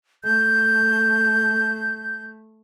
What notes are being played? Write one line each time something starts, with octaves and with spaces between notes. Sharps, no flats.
A3 G6